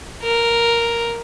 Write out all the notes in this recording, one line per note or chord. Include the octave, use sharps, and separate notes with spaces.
A#4